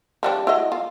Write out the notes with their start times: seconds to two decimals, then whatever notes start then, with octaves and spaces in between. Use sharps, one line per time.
0.23 F3 G3 D4
0.47 E4 F#4 D#5
0.72 F4